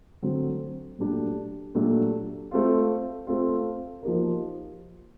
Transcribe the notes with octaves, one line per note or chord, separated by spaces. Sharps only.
D3 F#3 A3 C4
A#2 F#3 A3 D4 G4
A#2 F#3 A3 D4 G4
A3 C4 F4
A3 C4 F4
F3 A#3 D#4 G4 A#4